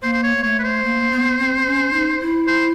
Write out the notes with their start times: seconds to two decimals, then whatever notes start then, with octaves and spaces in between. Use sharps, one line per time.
0.03 A#3 C5
0.13 C5
0.23 C#5
0.37 A#3
0.43 A3 C#5
0.59 B4
0.63 C5
0.84 A#3
1.12 B3
1.39 C4
1.66 C#4
1.93 D#4
2.20 E4
2.47 C5